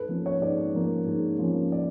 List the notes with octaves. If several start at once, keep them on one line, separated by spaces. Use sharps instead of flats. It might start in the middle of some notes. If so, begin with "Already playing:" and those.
Already playing: G#2 A4 B4
F3 A#3 C#4
C#5
G#2 D5
F3 A#3 C#4
G#2
F3 A#3 C#4
D5